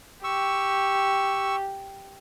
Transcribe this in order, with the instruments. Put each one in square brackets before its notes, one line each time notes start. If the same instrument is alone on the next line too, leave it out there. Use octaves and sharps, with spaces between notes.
[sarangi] G4 [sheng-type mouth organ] C#6 E6